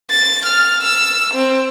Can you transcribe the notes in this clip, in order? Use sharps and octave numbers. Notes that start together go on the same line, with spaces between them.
A6
F6
E6
C4